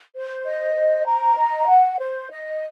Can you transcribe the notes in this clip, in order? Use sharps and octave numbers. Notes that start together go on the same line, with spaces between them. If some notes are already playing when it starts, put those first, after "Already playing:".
C5
D#5
C5
A#5
D#5
F#5
C5
D#5